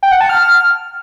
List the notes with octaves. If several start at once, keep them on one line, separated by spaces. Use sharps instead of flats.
G5
F#5
A5
F6